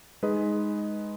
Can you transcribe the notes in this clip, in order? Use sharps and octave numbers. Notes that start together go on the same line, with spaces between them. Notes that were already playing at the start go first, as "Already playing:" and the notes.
G#3 D#4 G#4 B4 D#5